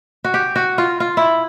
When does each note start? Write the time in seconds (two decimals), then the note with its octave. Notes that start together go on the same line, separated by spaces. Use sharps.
0.24 F#4
0.34 G4
0.56 F#4
0.78 F4
1.00 F4
1.17 E4